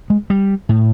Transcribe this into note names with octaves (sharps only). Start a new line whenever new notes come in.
G#3
G3
A2